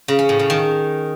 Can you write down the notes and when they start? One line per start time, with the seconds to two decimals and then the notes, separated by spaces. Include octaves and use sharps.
0.08 C#3
0.19 C#4
0.29 A2
0.39 C#3
0.50 D#3